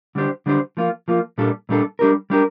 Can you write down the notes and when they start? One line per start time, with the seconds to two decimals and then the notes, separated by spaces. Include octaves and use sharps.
0.15 D3 G3 D4 G4 C5
0.46 D3 G3 D4 G4 C5
0.77 F3 A#3 F4
1.08 F3 A#3 F4
1.38 A#2 G3 D4 A4
1.69 A#2 G3 D4 A4
1.99 G3 D4 G4 A#4
2.30 G3 D4 G4 A#4